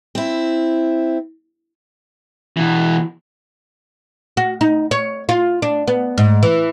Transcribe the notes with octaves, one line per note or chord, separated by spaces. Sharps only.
C4 E4
B2 E3
F#4
D#4
C#5
F4
D4
B3
G#2
E3